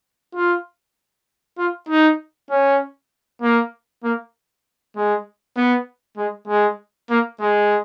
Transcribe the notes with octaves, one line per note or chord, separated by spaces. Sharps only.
F4
F4
D#4
C#4
A#3
A#3
G#3
B3
G#3
G#3
A#3
G#3